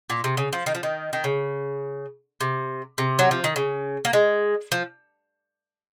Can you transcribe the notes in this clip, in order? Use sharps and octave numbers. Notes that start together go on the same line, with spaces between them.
A#2
C3
C#3
F3
D#3
F3
D#3
D#3
C#3
C3
C3
F#3
F3
D#3
C#3
A#3
G#3
F3